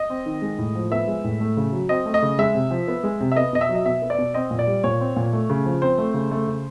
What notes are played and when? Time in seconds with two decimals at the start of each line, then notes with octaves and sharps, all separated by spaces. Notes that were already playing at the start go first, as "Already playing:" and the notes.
Already playing: D#5
0.10 C4
0.26 D#3
0.42 G#3
0.58 A2
0.75 F3
0.91 B3 E5
1.07 G#3
1.24 A2
1.40 A3
1.57 C#3
1.73 F#3
1.89 C4 D#5
2.06 A3
2.14 D#5
2.22 C#3
2.39 G#3 E5
2.54 C3
2.71 F3
2.88 B3
3.03 G#3
3.20 C3
3.32 E5
3.36 B3 D#5
3.53 B2 D#5
3.61 E5
3.69 F#3
3.75 D#5
3.86 B2 E5
4.02 B3
4.10 D5
4.18 B2
4.34 C4 D#5
4.51 A#2
4.59 D5
4.67 G3
4.84 A#2 C#5
5.00 C4
5.16 A#2
5.33 A3
5.50 C#3
5.65 F3
5.82 C4 C5
5.98 A3
6.14 C#3
6.31 A3
6.47 C#3